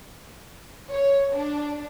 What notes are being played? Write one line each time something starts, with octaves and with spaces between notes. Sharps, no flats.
C#5
D4